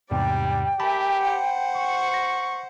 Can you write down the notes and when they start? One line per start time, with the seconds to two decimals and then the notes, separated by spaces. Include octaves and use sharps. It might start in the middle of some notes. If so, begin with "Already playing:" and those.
0.11 E2 G#2 C3 G3 D5 G5
0.80 G4 A#4 E5 G#5 A5 B5
1.19 C5 F#5
1.75 C#6
2.14 A#6